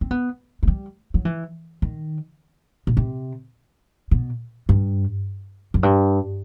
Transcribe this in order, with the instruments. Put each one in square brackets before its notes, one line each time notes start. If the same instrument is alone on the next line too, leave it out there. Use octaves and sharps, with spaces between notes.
[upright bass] C4
B3
A3
G3
F#3
E3
D#3
B2
C3
B2
G2
F#2
G2